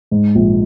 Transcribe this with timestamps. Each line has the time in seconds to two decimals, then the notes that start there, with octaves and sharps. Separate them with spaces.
0.11 G#2
0.35 A#1